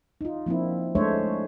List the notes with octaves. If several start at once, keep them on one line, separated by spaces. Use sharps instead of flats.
D#4 F4
F3 A#3 C4 D4 E4
G#3 A3 D4 C5 C#5 E5